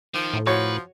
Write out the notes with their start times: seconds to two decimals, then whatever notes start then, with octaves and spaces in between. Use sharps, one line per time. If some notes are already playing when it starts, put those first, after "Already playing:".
0.15 D#3 F3
0.34 A2
0.47 F3 F#4 B4 C#5